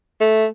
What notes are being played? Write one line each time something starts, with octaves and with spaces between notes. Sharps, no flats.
A3